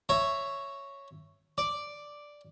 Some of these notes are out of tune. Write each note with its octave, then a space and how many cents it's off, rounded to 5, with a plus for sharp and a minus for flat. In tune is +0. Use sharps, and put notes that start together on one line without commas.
C#5 +0 E5 +10 A#5 +0
D5 +0 D6 +0